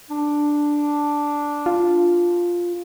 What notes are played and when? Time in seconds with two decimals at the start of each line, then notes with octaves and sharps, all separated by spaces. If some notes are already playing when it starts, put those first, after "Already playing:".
0.11 D4
1.66 F4